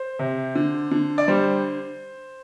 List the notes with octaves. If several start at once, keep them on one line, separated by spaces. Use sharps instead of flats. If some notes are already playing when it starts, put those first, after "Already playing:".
Already playing: C5
C3
D3
D3
D5
G3 C5